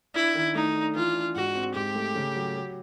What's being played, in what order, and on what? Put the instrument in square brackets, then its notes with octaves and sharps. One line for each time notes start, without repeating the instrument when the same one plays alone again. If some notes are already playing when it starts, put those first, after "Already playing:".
[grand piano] D4 [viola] E4
[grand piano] D#3
[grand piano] A3 [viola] D#4
[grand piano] D4
[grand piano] E3 [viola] F4
[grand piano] D4
[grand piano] G#2 [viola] F#4
[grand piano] C4
[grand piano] G#2 [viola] G4
[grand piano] A3
C#3
F#3
F#3